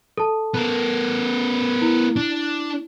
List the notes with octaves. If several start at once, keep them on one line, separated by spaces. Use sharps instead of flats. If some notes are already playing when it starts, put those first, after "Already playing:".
A4 A5
B3 A#4
E4
D4